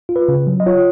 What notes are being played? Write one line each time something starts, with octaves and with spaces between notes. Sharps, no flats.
F4
B4
C#3
F#3
D#5
F4 C#5